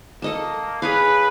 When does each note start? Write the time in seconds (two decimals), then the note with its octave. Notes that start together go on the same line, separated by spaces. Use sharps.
0.22 A#3 A4 D#5 A5
0.82 G#4 B4 C#5 F5